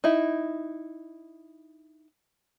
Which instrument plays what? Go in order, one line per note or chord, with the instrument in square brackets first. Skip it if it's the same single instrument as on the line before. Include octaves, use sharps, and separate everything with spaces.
[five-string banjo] D#4 E4